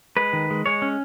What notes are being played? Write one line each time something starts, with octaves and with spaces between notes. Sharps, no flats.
G#3 B4
D#3
G#3
G#3 C#5
C#4